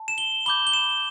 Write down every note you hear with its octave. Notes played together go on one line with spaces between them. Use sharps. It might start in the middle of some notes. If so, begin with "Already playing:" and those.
Already playing: A5
E7
G7
B5 D6 G6 G7
G7
E7